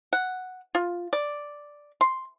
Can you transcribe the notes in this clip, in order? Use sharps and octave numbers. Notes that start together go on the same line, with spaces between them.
F#5
F4
D5
C6